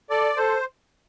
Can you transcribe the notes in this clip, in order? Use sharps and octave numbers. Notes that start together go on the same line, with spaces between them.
A4 D5
A4 C5